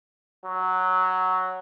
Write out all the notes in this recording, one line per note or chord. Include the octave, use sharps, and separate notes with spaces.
F#3